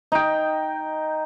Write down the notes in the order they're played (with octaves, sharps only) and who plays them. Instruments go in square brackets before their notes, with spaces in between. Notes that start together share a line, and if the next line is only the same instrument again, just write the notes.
[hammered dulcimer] D#4 G5